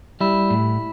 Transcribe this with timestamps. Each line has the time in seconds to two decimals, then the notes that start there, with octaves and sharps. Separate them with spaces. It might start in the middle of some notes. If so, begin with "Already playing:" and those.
0.21 G3 E4
0.50 A2